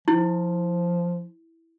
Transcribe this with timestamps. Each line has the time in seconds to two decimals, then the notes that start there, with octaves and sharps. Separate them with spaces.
0.08 F3 E4